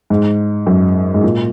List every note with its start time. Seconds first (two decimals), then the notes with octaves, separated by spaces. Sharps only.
0.10 G#2
0.67 F#2
1.14 G#2
1.24 A#2